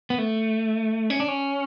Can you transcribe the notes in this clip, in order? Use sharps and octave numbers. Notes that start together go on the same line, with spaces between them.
B3
A3
C#4
D4
C#4